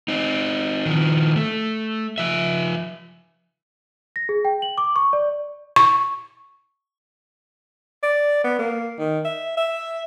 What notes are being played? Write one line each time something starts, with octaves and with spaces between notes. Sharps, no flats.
C4 D#4
D#3 F3
A3
F3 E5
A#6
G#4
G5
F#7
D6
C#6
D5
C#6
D5
B3
A#3
D#3
E5
E5